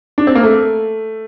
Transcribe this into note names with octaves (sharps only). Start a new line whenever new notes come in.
D4
C4
A#3
A3